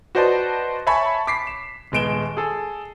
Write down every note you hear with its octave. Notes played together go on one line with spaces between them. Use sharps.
F#4 B4 C5 D5 D#5 A5
C#5 E5 G#5 A5 B5 C#6
D6 B6 C7
E7
D#1 G#3 B3 D7 E7 G7
G#4 A4